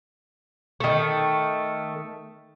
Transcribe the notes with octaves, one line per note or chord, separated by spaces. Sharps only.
D#3 A3